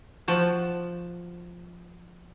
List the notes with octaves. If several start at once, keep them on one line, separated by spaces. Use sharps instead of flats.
F3 F#4 A5